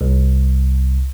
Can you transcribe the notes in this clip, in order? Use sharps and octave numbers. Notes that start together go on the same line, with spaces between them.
C2